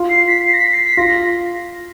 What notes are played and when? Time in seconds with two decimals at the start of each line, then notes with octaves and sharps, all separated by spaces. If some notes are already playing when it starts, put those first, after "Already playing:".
Already playing: F4
0.09 C7
0.27 B6
0.45 C7
0.53 A#6
0.58 B6
0.72 C7
0.85 B6
0.97 F4 A#6